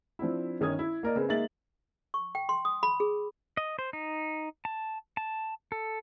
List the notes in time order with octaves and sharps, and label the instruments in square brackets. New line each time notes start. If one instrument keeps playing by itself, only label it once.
[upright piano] F3 C4 D4 E4
G1 D#3 C#4 D#6 G#6
E4
A#3 A#4 D5 D#5
C#3 C4 B4
G#3 A#3 D#4 E5 A6 F#7
[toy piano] C#6
G5
C6
D#6
B5
G#4
[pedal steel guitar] D#5
C5
D#4
A5
A5
A4